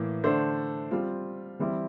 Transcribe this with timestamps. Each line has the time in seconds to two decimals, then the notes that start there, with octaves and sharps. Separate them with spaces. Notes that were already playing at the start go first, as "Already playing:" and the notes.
Already playing: A2 E3 A#3
0.24 D3 A3 D4 A4 C5
0.91 G3 C4 F4
1.59 E3 G3 C4 E4